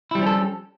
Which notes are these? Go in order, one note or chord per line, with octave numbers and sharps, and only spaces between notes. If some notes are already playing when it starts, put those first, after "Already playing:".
F3 G3 C#4 E4 A4